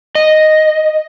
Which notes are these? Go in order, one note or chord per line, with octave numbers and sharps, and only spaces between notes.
D#5